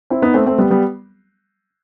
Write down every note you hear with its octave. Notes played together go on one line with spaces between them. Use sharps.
C4 E4
B3 D#4
A3 C4
A3 C4
G3 B3
G3 B3